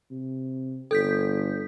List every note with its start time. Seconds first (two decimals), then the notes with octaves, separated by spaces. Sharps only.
0.11 C3
0.91 G1 A4 G6 B6